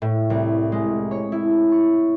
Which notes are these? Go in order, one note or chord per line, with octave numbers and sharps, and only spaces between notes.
A2
C2
G#3
C#5
E4
C#6